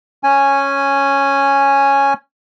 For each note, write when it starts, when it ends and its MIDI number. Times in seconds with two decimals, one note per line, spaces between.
0.23 2.13 61
0.23 2.13 80